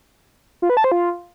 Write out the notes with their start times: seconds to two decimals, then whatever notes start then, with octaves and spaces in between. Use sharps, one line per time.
0.62 F4
0.70 B4
0.77 A5
0.84 C5
0.92 F4